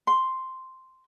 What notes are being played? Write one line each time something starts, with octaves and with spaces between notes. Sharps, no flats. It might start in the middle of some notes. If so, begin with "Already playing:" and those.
C6